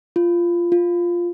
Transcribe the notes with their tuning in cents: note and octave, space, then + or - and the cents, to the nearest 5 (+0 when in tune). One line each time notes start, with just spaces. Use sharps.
F4 -15
F4 +0